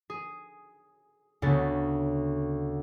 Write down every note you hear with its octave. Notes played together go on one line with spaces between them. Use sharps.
G#4
D2 C#3 B3 A6